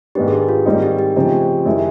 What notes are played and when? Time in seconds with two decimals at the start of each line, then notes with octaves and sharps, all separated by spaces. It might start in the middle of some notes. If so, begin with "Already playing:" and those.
0.15 G#2 D#3 G#3 B3 D4 G4
0.28 G#4
0.32 G4
0.49 F4
0.66 G#2 D#3 G3 C4 D#4
0.82 G4
0.99 G4
1.16 C#3 F3 A3 C4 D#4
1.65 F#2 D#3 G#3 C#4 E4